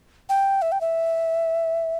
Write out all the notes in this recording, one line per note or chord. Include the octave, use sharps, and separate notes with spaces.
G5
E5
G5
E5